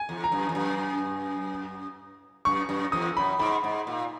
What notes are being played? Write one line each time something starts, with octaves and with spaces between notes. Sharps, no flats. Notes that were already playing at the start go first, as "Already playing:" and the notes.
Already playing: G#5
E2
A#5
F#2
E2
F#2
F#2 C#6
F#2
E2 D#6
F#2 B5
G#2 B5
G#2
A#2